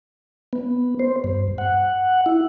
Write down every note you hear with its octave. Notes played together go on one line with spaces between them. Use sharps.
B3
C5
G2
F#5
E4